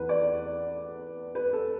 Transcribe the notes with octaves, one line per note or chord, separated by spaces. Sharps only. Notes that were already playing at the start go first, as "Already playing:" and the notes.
Already playing: E2 E3 B4
D5
B4
A4